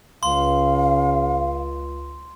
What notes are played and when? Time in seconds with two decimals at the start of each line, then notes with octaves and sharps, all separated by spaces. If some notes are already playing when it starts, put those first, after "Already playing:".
0.23 C#2 C#3 F5 C6